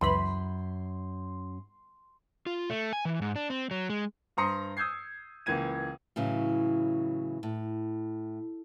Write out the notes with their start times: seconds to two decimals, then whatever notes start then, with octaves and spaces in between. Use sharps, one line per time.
0.01 C#2 F#2 E3 B5 C6
2.46 F4
2.70 A3
2.93 G#5
3.05 E3
3.22 G#2
3.36 D4
3.50 C4
3.71 F#3
3.90 G#3
4.37 G2 C5 A#5 C6 D#6 C#7
4.77 D#6 E6 G6 G#6 C7
5.46 C#2 E3 A#3 G#6 D#7
6.16 A2 C#3 E3 F#3
7.43 A2